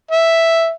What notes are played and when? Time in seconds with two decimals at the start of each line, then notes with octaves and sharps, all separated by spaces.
0.11 E5